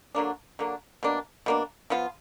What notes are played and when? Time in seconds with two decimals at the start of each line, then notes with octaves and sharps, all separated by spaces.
0.15 D3 F#3 A#3 D4
0.59 D3 F#3 A#3 D4
1.03 B2 A#3 D4
1.46 B2 A#3 D4
1.90 F3 B3 F4